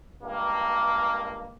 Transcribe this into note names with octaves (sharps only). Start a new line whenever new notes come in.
C#2 G2 A#3